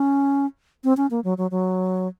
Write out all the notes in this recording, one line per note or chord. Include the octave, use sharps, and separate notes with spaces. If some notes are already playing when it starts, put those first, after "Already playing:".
Already playing: C#4
C4
C#4
A#3
F#3
F#3
F#3